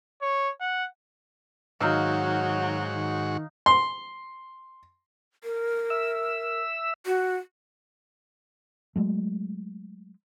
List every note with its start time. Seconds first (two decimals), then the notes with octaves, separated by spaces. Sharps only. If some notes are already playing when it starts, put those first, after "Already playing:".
0.22 C#5
0.60 F#5
1.81 G#2 D#3 F#3 D#4 F#4 F5 C#6 E6
2.92 D#3
3.66 C6
5.44 A#4
5.90 E5 E6
7.06 F#4
8.96 F#3 G#3 A3